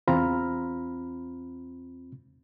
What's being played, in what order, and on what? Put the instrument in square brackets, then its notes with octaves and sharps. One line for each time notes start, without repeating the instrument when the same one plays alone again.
[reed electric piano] E2 C4 F4 A#5 B5 F6